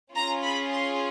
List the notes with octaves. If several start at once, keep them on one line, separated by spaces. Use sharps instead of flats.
C#4 F4 G#4 A#5
B5
C6